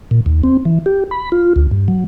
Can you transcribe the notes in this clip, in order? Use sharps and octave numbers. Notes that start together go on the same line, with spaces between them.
A#2
D#2
C4
E3
G4
B5
F4
D2
G2
F#3